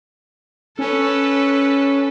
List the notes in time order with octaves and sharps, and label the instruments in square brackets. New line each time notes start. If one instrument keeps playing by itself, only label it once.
[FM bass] C#4 [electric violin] A4 B4